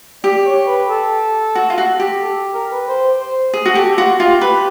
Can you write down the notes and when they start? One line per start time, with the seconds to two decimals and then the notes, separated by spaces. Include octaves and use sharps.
0.24 G4 D5
0.46 C#5
0.67 B4
0.89 A4
1.55 F#4
1.70 F4
1.78 F#4
2.00 G4
2.21 A4
2.54 A#4
2.72 B4
2.88 C5
3.21 C5
3.54 G#4
3.66 F#4
3.75 G4 A4
3.97 F4 F#4
4.20 F4 G4
4.41 B4